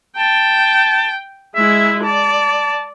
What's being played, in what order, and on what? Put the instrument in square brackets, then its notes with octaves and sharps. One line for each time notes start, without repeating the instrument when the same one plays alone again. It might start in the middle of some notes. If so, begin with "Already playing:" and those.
[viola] G5 [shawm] A5
[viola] G#3 E4 [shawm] E5
[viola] D5 [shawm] A5